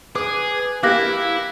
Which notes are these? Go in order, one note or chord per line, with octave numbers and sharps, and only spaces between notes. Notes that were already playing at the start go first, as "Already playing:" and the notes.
G#4 B4 D6
A#3 E4 G4 F5 D6 F#6 A#6